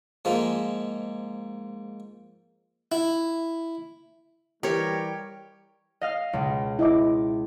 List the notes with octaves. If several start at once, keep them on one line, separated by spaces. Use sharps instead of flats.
G#2 F3 G#3 A#3
E4
E3 G3 G4 A#4 C#5
D#5 F5 F6
C#2 B2
E4 D#5 D6